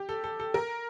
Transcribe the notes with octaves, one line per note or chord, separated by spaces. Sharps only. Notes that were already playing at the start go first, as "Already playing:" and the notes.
Already playing: G4
A4
A4
A4
A#4